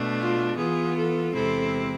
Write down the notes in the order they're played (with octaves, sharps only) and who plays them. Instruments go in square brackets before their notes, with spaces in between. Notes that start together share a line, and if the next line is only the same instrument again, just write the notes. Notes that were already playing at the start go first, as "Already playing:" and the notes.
Already playing: [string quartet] B2 A3 D4
F4
E3 B3 F4 G#4
A4
E2 C3 G#3 C4 E4 A4